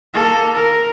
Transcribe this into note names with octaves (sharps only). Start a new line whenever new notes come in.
A#3 A4
A#4